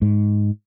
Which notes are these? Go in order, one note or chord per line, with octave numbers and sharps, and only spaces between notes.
G#2